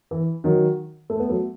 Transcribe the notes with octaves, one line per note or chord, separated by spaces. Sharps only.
E3
D#3 F#3
A3
B3
F#3 A3